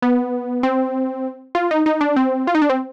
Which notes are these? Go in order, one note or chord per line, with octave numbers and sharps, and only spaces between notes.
B3
C4
F4
D#4
D#4
D4
C4
F4
D#4
D4
C4